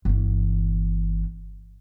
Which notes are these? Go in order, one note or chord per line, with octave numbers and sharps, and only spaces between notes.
G1 E3